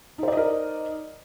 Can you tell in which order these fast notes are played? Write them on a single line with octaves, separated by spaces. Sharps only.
D#4 C5 D5 D#5 A#4